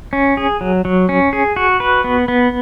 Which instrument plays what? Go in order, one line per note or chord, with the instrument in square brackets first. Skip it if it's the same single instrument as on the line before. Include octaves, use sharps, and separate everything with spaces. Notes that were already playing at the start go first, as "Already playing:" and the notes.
[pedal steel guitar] C#4
G#4
F#3
F#3
C#4
G#4
F#4
B4
B3
B3